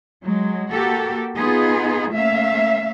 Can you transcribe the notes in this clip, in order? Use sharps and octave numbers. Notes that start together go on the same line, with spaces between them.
F#3 G#3
A#3 F#4 G4 A4
B3 D#4 F4 G#4
A3 A#3 C#4 E5 F5